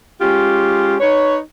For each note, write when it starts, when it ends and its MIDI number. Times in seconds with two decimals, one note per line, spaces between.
0.21 0.96 56
0.21 0.96 61
0.21 0.96 65
0.21 0.96 67
1.00 1.38 63
1.00 1.38 71
1.00 1.38 73